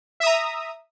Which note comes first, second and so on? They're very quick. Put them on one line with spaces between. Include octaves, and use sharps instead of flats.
E5 D#6 A#5